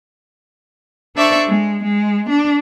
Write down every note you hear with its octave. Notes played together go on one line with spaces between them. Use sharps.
D4 A4 C5 D5 E5 C#6
G#3
G#3
D4